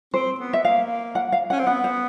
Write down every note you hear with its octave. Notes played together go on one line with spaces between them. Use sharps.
C4 C5
B3
E5
A#3 F5
F#5
F5
C#4 F#5
C4
B3 F#5
C5